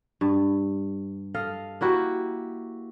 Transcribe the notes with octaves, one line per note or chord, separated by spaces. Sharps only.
G2
A4 D#5 F5
A#3 E4 F#4 G4